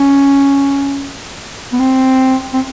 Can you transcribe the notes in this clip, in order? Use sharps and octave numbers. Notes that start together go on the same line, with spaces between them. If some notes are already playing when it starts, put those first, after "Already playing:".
Already playing: C#4
B3
C4
C4